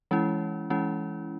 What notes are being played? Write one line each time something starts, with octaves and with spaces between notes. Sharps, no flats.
E3 G#3 C#4 E4
E3 G#3 C#4 E4